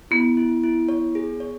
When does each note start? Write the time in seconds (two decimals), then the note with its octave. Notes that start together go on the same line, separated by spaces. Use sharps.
0.11 B3 E4
0.37 E4
0.63 E4
0.89 C#5
1.15 G#4
1.40 C#5